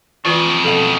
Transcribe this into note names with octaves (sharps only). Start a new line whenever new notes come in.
F2 C#3 E3 F4 D5
B2 A4 F5